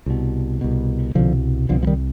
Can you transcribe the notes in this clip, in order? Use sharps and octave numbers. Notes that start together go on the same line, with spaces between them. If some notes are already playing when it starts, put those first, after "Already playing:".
C2 B2
C2 B2
C2 B2 D3 F3
C2 B2 D3 F3
F3
D#3 G3